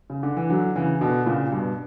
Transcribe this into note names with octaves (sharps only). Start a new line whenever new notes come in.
C#3
D3
E3
D3 F#3
C#3 E3
B2 D3
A#2 C#3
G2 B2